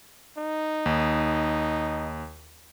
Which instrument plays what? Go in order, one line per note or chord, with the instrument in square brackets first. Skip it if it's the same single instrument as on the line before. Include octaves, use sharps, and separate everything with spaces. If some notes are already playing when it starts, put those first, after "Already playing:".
[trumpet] D#4
[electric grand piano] D#2